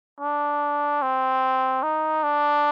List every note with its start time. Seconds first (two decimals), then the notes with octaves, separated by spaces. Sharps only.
0.20 D4
1.02 C4
1.83 D#4
2.23 D4